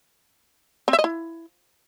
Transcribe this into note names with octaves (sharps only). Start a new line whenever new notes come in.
C4
E5
D#5
E4